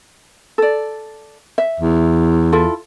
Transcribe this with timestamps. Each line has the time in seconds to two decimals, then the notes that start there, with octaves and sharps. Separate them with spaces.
0.58 A4 D5
1.58 E5
1.80 E2
2.52 E4 F4 A4